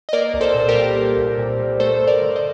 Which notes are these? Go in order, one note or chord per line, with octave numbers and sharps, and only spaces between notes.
D#5
A#3 A#4 D5
C2
A4 C5
A#2
G4 A#4
G3
A#3
C2
A#2
G3
A3 A4 C5
G2
A#4 D5
D3
C5 D#5